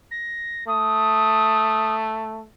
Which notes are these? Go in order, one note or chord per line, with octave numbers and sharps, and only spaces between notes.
A#6
A3 D#6